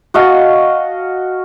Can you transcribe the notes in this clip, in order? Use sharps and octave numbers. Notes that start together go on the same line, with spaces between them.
F#4 D#5 F5 A5